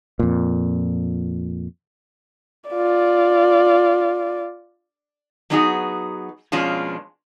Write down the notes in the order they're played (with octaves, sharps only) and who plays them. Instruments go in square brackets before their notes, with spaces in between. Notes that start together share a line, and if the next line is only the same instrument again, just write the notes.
[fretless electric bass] F2 A#2
[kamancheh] F4 D5
[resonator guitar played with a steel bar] F#3 B3 D4 D#4 F#4 G#4
F2 B2 G#3 C#4 D4 F4